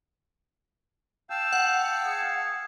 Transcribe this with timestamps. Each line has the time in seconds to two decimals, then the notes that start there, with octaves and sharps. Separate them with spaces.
1.30 F5 G5 A5 E6
1.53 F#5
2.04 G#4